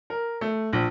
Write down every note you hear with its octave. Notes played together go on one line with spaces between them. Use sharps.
A#4
A3
A#1